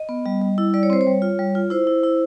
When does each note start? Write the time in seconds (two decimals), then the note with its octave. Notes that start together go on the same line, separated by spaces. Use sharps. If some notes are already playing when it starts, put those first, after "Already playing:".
Already playing: D#5
0.09 B3
0.26 G3
0.42 G3
0.58 E4
0.74 G3 D5
0.83 C#5
0.90 C4 C5
1.01 C#5
1.07 G3
1.22 F4
1.39 G3
1.55 F4
1.70 E4 C5
1.87 E4
2.04 E4